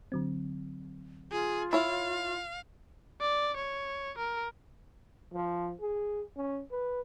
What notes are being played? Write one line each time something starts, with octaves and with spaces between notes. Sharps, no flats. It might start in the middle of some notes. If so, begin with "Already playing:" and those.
D3 F#3 C4
F4 G#4
E4 C#5 F5
D5
C#5
A#4
F3
G#4
C#4
B4